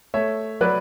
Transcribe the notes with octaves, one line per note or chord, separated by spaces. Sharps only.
A3 C#5 E5
F#3 B4 D5